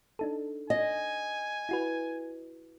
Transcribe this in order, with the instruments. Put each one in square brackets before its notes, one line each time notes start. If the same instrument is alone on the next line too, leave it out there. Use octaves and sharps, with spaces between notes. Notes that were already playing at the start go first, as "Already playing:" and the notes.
[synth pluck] D4 D#4 A4
[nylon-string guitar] D#5 [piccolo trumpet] G#5
[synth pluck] E4 F#4 B4